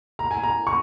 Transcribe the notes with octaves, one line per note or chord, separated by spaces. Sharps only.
A#5
G#5
A#5
C#6